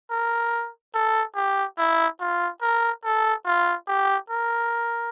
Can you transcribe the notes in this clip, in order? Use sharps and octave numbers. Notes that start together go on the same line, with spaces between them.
A#4
A4
G4
E4
F4
A#4
A4
F4
G4
A#4